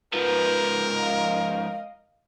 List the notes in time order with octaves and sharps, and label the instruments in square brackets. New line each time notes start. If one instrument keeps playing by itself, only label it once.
[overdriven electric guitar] G#2 F3 [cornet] A#4 [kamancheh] B4
[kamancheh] D#5 F5